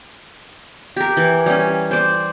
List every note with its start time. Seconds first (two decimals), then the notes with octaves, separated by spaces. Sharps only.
0.96 G4 A#4
1.17 E3
1.46 G3 C#4
1.91 C5 D5